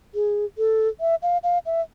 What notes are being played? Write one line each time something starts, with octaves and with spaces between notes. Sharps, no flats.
G#4
A4
E5
F5
F5
E5